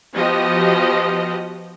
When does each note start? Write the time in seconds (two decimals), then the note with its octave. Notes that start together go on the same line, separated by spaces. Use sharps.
0.16 F3 B3 F#4 G4 D#5